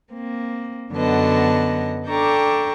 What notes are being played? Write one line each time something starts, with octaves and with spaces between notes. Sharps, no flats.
A#3 C4
F#2 D3 F#3 B3 D#5 A5
D4 A4 G5 A#5 C#6 D6